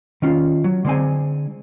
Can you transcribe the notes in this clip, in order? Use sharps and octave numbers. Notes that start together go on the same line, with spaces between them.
D#3 C#4 F4
F#3
D3 G#3 C4 G#5